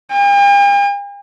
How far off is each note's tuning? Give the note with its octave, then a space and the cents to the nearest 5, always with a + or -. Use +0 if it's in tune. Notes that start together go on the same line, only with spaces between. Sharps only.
G5 +45